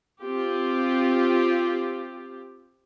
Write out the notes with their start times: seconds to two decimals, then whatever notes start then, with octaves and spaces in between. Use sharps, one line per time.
0.21 C4 F4 G4